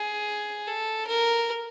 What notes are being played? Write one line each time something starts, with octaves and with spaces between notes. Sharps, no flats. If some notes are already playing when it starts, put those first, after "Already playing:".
Already playing: G#4
A4
A#4